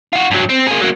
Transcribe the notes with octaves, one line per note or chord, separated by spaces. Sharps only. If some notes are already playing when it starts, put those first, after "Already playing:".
F4 F#4
G2 F#3
C4
A#3 G#4
F#3 A#3